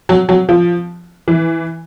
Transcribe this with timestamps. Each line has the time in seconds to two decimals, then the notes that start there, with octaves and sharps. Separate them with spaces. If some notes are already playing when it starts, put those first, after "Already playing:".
0.09 F#3
0.29 F#3
0.49 F3
1.28 E3